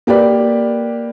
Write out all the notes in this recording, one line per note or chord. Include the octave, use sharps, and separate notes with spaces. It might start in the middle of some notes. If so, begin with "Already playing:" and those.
A#3 G4 B4 D5